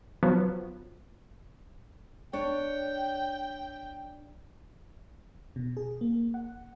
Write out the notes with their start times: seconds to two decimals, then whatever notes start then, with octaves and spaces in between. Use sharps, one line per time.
0.23 F3 F#3 B3
2.33 D4 C#5 G5
5.56 B2
5.77 G#4
6.01 A#3
6.34 F#5